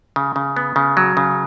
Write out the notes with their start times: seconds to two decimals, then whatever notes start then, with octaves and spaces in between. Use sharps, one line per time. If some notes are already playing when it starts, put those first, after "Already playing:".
0.16 C#3
0.36 C#3
0.56 B3
0.76 C#3
0.97 F#3
1.17 C#3